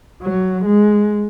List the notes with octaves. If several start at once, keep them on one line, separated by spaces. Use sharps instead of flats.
F#3
G#3